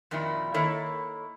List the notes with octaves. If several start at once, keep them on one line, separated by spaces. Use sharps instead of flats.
F2 A#2 D#3 G3 E4
D#3 A#3 E4 A4 C#5